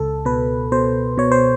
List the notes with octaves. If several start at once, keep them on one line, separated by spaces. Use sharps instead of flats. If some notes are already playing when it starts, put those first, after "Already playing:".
Already playing: C#2 A4
B2 B4
B2 C5
B2 C#5
C5